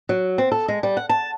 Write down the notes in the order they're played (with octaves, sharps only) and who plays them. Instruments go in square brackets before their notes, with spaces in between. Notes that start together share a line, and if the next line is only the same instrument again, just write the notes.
[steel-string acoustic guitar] F#3
C4
A4
G#3
G3
F#5
A5